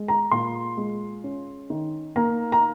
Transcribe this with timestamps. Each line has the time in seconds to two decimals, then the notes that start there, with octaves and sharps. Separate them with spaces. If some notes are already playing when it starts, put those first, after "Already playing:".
Already playing: G#3
0.08 A#5
0.31 A#2 C6
0.77 G#3
1.24 C#4
1.70 D#3
2.16 A#3 A#5
2.52 A#5